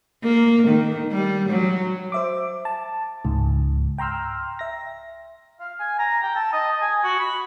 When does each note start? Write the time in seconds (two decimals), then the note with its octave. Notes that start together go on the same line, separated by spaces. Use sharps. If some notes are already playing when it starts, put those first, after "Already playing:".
0.24 A#3
0.68 D#3
1.11 G3
1.50 F#3
2.12 C5 E5 D6
2.65 A5
3.25 C#2 G#2
3.98 G5 A#5 C6 E6 F6
4.59 E5 A#6
5.60 F5
5.80 G#5
5.99 A#5
6.23 G5
6.36 A5
6.53 D#5
6.82 G#5
7.04 F#4
7.20 B5